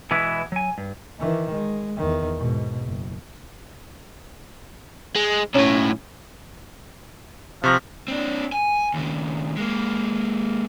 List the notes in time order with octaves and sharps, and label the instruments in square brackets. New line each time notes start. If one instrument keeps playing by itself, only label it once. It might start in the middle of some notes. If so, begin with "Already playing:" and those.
[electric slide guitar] B2 E3 G#3 B3 E4
F#3 G#5
G2
[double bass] D#3 E3
G#3
E2 D#3
G#2 B2
F#1
[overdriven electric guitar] G#3
[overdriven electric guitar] B1 A2 [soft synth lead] C#4
[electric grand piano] C3 C#6 A#6 [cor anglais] F3
[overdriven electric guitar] C4 D4
G#5
D#2 C#3
G#3 A#3